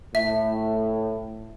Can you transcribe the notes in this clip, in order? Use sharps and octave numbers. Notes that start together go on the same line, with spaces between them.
A2 E5